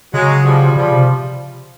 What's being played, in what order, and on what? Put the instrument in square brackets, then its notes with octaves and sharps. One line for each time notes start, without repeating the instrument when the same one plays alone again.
[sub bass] C#3 [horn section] F#3 G#3
[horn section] F3 G3
[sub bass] C#3 [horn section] F3 G3
[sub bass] C3